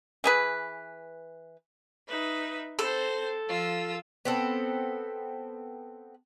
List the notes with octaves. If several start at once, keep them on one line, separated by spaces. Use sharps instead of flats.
E3 G#4 B4
D#4 B4 E5
C4 A4 C5
F3 F4 E6
B3 C4 A4